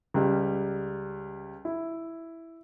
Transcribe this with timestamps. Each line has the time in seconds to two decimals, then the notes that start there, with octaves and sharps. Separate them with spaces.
0.14 C#2 G3
1.65 E4